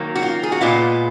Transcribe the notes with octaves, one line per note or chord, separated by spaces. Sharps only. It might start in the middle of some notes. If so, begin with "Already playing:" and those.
Already playing: D#3 F#3 A#3
F#4
F4
G#4
F#4
A#2 G#3 B3 F4